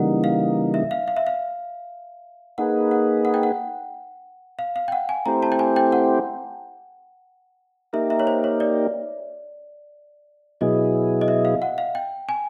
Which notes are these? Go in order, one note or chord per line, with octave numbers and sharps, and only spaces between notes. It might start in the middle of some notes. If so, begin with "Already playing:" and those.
Already playing: C#3 E3 G3 A#3 D#4 F#5
F5
E5
F5
F5
E5
F5
A#3 D#4 G#4 B4 F#5
F#5
F#5
G5
F#5
F5
F5
G5
F#5
G#5
A3 C4 E4 G4 C5 A#5
A5
G5
G#5
G5
F#5
A#3 D#4 G4 A#4 E5
E5
C#5
C5
C#5
D5
B2 F#3 B3 E4 G#4 D#5
D#5
E5
F5
F#5
F5
G5
G#5